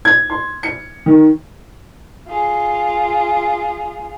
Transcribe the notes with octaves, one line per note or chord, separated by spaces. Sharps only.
G#6
C6
C#7
D#3
F4 G#4